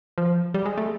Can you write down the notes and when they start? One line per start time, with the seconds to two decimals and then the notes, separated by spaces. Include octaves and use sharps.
0.18 F3
0.54 G3
0.66 G#3
0.77 A3